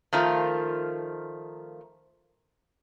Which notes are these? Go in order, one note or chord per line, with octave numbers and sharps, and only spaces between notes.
D#3 F3 A3 F4